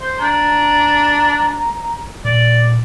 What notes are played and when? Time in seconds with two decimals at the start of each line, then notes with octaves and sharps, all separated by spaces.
0.01 C5
0.19 D4 A#5
2.25 A#2 D5